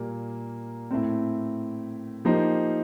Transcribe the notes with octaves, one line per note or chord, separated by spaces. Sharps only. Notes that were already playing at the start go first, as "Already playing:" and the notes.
Already playing: A#2 G3 A#3
A2 A3 C4
F3 A#3 D#4 G4 C5